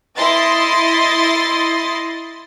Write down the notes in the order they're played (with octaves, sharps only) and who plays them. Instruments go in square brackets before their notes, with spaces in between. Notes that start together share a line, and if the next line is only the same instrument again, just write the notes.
[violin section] E4 D#5 C6 A6